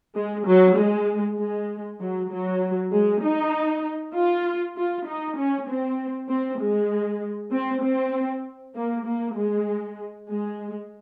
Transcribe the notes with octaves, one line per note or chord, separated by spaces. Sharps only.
G#3
F#3
G#3
G#3
F#3
F#3
G#3
D#4
F4
F4
D#4
C#4
C4
C4
G#3
C4
C4
A#3
A#3
G#3
G#3